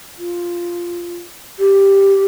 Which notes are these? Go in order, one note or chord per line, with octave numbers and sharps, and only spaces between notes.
F4
G4